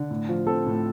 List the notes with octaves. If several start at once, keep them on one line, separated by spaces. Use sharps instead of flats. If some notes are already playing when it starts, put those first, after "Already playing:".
Already playing: D3
A2
F3
C4 A4
A2